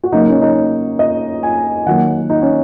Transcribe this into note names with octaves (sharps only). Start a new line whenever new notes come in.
F#4
C#3 F#3 A#3 D#4
C#4
D#4
D#5
G#5
D#3 F#3 A#3 F#5
D#4
C#4